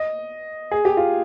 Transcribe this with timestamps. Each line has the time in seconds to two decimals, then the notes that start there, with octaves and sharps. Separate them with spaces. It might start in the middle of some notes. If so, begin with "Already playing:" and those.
Already playing: D#5
0.71 G#4
0.85 G4
0.97 F4